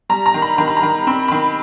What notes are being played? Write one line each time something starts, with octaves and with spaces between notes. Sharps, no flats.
G3 A#5
A#5
D#3
B5
D#3 A#5
B5
A#5
D#3
C4 B5
D#3 B5